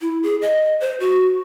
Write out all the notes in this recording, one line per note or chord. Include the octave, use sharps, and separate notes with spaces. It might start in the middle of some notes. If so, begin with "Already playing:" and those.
E4
G#4
D#5
C5
F#4